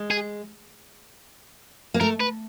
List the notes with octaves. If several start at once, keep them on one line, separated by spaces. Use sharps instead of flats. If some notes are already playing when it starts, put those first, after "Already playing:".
Already playing: G#3
G#4
A#3
A3 A#4
B4